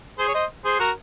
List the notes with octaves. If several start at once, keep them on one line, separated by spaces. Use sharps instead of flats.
G#4 C5
C#5
C5 D#5
G#4 C5
F#4 A#4